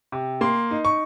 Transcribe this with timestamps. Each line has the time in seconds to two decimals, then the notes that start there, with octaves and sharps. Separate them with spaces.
0.12 C3
0.41 A#3 C6
0.71 D#4
0.85 C#6